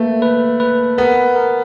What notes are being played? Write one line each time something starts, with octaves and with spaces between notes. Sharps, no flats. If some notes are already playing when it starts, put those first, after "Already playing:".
Already playing: A3 A#3 B4
B4
B4
B3 A#4
A#4